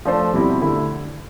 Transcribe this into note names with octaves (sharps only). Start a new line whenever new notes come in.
F3 A3 D4 A4 C5
B2 G3 C4 E4
D3 A3 E4